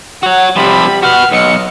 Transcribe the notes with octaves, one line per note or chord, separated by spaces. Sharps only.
F#4 C#5 F#5
C3 F3 G3 B5
F#4 B4 F#5 F6
B1 D#5 C#7